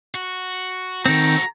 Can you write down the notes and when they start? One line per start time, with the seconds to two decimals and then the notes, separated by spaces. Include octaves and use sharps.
0.15 F#4
1.06 D#3 C4 F#4 A4 A#5